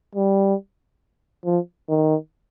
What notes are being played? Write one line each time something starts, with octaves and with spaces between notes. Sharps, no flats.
G3
F3
D#3